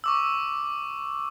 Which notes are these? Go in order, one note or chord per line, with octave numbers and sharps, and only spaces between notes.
C#6 D6 E6